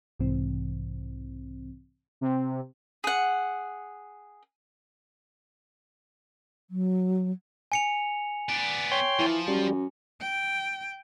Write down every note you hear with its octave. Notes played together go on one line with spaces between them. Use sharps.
B1 G#2 C3 E3 C4
C3
G#4 F#5
F#3
G#5 C#7 F7
B3 D5
C#5 G5 C6
E3 F3
F#2 G3
G5